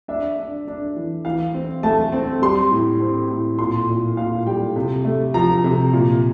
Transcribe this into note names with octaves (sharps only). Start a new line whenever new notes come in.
D4 E5
D4
D4
E3
E3 F5
C4
A3 A5
C4
G3 C6
A2
C4
A2
A#2 C6
A#2
A#2 F5
G3 G5
C3
A3
F3 A#5
C3
A#2